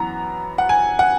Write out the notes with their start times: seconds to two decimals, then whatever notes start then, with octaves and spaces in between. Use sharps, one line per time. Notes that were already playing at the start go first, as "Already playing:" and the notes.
Already playing: F#2 E3 B3 A#5
0.58 F#5
0.69 G#5
0.99 F#5